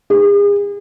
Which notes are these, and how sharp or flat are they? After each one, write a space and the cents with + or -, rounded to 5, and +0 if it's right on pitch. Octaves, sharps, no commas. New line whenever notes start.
G#4 -40